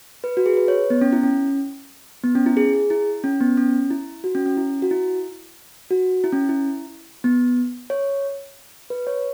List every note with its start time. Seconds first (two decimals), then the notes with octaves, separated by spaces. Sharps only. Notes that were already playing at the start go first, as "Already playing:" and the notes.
0.24 B4
0.37 F#4
0.46 G#4
0.57 B4
0.68 C#5
0.90 B3
1.01 C#4
1.13 E4
1.23 C#4
2.24 B3
2.35 C#4
2.46 E4
2.57 G#4
2.73 G#4
2.90 E4
3.24 C#4
3.40 B3
3.57 C#4
3.90 E4
4.24 F#4
4.35 C#4
4.46 C#4
4.57 E4
4.82 F#4
4.91 E4
5.91 F#4
6.24 E4
6.32 C#4
6.49 E4
7.24 B3
7.90 C#5
8.90 B4
9.07 C#5